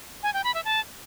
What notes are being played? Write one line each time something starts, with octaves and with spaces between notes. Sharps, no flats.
G#5
G5
B5
E5
A5